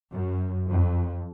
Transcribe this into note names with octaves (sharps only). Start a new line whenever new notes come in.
F#2
F2